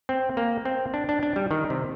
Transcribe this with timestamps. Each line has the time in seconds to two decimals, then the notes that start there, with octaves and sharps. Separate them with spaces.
0.09 C4
0.37 A#3
0.65 C4
0.94 D4
1.09 D4
1.23 D4
1.36 G3
1.51 D#3
1.70 C3